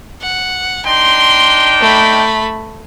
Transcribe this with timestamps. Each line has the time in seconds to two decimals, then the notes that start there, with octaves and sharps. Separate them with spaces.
0.22 F#5
0.86 D4 D#4 G5 C6
1.81 A3 B5